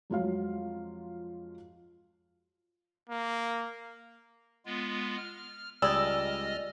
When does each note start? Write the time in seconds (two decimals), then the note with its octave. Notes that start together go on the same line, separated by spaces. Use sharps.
0.10 F2 F#3 G#3 F4 F#4 F5
3.09 A#3
4.66 G#3 B3 F4
5.17 F6
5.82 C#2 G3 G#4 D5 D#5 E6 F6